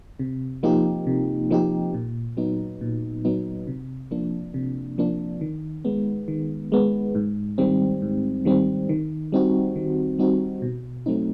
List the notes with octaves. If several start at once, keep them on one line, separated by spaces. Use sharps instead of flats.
C3
F3 A#3 D#4 G4
C3
F3 A#3 D#4 G4
A#2
F#3 B3 D#4
A#2
F#3 B3 D#4
C3
F3 A#3 D4
C3
F3 A#3 D4
D#3
G#3 B3
D#3
G#3 B3
G#2
D#3 G3 C4
G#2
D#3 G3 C4
D#3
G3 C4 D#4 F#4
D#3
G3 C4 D#4 F#4
B2
F#3 A3 C4 D#4